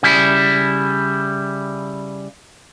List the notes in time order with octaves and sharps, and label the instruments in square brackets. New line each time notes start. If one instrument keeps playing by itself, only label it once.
[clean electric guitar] C#3 G3 E4